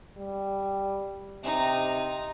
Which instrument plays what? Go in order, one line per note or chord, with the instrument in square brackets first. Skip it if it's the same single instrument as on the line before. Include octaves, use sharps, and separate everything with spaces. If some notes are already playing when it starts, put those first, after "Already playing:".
[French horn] G3
[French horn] C3 [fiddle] D#4